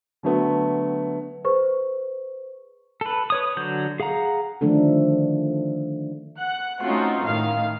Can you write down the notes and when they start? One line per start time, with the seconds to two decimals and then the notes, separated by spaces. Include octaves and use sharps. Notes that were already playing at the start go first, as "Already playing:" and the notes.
0.23 D3 F#3 A3 B3
1.44 G#4 B4 C5 C#6
3.01 A4 B4
3.30 B4 C#5 D#6
3.57 D3 F#3 G6
4.00 G#4 F5 F#5 A#5
4.61 D3 D#3 F3 A3 D4 A4
6.38 F#5 F#6
6.82 A3 C4 C#4 D#4 F4 F#4
7.25 A2 D#3 F5